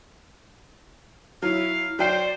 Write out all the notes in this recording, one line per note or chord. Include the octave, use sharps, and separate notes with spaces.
F#3 E4 F5
F#3 C5 D5 G5 C7